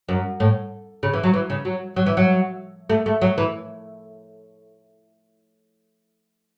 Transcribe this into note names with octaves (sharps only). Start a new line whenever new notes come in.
F#2
A2
C#3
E3
F#3
E3
C#3
F#3
F#3
E3
F#3
A3
A3
F#3
E3